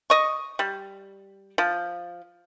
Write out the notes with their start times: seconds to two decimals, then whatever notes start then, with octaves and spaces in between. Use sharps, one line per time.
0.10 D#5 C#6
0.59 G3
1.58 F3